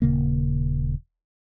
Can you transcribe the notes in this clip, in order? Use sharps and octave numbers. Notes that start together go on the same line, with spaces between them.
D#1 C#3 A#3